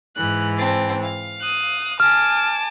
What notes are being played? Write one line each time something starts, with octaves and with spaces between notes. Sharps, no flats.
G#2 E3 F#6
C4 A5
F5
D#6 F#6
G#5 A5 D6 F6